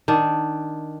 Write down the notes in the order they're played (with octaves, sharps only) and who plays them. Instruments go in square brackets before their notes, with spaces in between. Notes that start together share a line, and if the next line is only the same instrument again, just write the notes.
[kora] D#3 D4